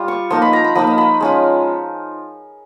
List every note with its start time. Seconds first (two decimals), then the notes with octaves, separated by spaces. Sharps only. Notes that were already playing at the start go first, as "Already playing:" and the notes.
Already playing: G3 F4
0.08 C#6
0.30 F3 A#3 D#4 C6
0.42 B5
0.53 A#5
0.64 B5
0.75 F3 A#3 D#4 B5
0.87 A#5
0.98 B5
1.20 G#3 C#4 F4